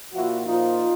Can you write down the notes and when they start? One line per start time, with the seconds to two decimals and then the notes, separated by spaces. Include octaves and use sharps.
0.14 A#2 F3 E4 F#4
0.47 A#2 F3 D#4 F4